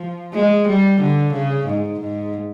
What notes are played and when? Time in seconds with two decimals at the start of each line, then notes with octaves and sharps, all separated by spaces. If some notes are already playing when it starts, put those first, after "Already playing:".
Already playing: F3
0.33 G#3
0.68 G3
1.01 D3
1.34 C#3
1.67 G#2
2.00 G#2